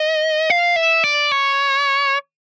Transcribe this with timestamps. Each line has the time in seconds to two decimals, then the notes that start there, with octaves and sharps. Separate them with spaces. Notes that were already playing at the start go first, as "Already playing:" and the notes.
Already playing: D#5
0.50 F5
0.76 E5
1.04 D5
1.32 C#5